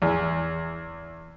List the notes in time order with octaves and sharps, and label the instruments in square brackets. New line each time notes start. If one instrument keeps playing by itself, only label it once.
[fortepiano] E2